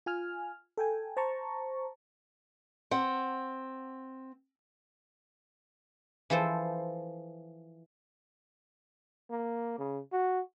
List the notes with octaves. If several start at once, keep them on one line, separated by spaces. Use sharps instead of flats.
F4 G#5 F6
A4 G5 G#5
C5 A5 A#5 C#6
C4 F#5
E3 F3 A4 C5
A#3
C#3
F#4